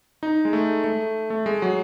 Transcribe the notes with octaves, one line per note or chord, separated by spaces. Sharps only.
D#4
G#3
A3
A3
A3
G#3
F#3